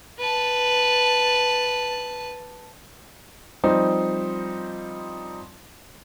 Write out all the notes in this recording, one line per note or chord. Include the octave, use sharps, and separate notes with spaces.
B4 A5
F3 G3 C4 D#4